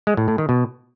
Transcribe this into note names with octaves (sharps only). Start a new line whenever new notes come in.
G#3
A2
A2
D#3
B2